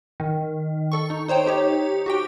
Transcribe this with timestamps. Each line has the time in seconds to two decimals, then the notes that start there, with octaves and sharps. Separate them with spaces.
0.20 D#3
0.92 A4 C#6
1.10 D#4
1.28 D#4 C5 C#5 G5
1.46 D#4 G4 C#5
2.06 F#4 G4 G5